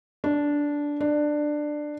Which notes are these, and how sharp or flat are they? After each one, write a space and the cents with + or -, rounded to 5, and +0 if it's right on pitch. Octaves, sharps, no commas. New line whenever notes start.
D4 -10
D4 +15